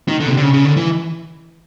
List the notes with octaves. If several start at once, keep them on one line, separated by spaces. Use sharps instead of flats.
D#3
D3
B2
C3
D3
C#3
C#3
D3
E3